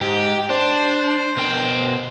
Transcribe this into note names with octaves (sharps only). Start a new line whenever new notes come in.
G#2 G4
D4 C5
B2 A#4 G5